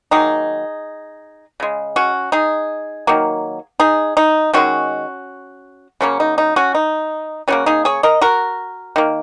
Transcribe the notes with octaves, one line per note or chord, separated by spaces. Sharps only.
D#3 F#3 A#3 D#4 G#4
C#3 G#3
C#4 F#4
D#4 G#4
D#3 F#3 A#3
D#4 G#4
D#4
D#3 G#3 C#4 F#4
C#3 F#3 A#3 C#4
D#4
D#4
C#4 F#4
D#4
C#3 F#3 A#3 C#4 F#4
D#4 G#4
G#4 C#5
A#4 D#5
F#4 A#4
D#3 A#3